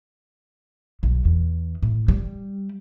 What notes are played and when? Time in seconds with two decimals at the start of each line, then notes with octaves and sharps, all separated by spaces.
1.03 B1
1.25 E2
1.82 A2
2.08 G3